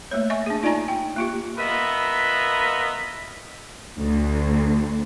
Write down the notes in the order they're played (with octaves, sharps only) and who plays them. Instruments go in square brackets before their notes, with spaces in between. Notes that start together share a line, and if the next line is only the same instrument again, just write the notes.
[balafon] A3 A#3 C#5
D#5 E5 G#5 C#6
D4 G#4
D#4 F4 D5 D#5 G#5 A#5
G5
A#3 F4 G4
[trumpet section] B3 F4 A#4 B4 D#5 E5
[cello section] D2